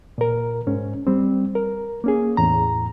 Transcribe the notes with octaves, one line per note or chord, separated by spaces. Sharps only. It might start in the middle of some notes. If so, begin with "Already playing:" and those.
A#2 A#4
G#2 C#4
G3 C4
A#4
A#3 C#4 G#4
E2 A2 A#5